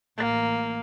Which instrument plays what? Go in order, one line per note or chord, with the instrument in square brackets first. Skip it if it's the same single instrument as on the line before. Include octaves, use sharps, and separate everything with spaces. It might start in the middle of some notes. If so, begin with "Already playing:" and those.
[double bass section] A1 [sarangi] A#3